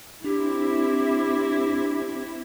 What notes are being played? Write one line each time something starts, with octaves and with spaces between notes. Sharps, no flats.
C4 D4 E4 G4